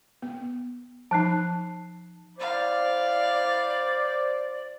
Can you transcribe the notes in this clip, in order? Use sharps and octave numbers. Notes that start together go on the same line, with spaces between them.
B3
F3 D#4 A5 F#6 C7
E4 C5 D5 F5